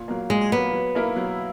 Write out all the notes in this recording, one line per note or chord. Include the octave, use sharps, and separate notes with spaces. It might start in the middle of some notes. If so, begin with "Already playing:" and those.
Already playing: A#2
F#3 A#3
A#2 G#3
F#3 A#3 B3
F#3
A#3 E4 A#4
F#3